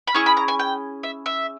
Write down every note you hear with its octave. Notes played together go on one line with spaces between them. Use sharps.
B5
C#4 E4 G#4 C#6
B5
A#5
G#5
G5
E5
E5